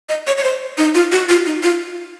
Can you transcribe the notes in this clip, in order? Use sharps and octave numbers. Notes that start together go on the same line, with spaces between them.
D#5
C#5
C#5
C5
D#4
F4
F#4
F4
D#4
F4